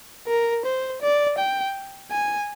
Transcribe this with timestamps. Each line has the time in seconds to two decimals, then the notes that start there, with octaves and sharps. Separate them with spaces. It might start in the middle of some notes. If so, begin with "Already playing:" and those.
0.27 A#4
0.65 C5
1.02 D5
1.38 G5
2.11 G#5